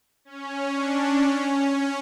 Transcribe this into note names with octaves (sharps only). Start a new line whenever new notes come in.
C#4
D4
C#4